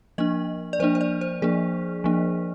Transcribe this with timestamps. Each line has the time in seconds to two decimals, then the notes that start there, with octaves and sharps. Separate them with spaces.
0.18 F3 A#3 D4 D#5
0.73 D5
0.80 F3 A#3 D4 C5
0.95 C5
1.01 D5
1.21 C5
1.42 F3 A#3 D4 G#4
2.04 F3 A#3 D4